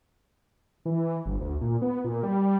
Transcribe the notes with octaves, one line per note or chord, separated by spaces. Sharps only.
E3
G1
D2
A#2
B3
A#2
G3